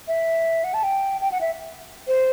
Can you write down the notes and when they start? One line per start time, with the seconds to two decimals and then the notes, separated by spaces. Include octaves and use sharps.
0.08 E5
0.64 F#5
0.74 A5
0.83 G5
1.21 G5
1.32 F#5
1.41 E5
2.07 C5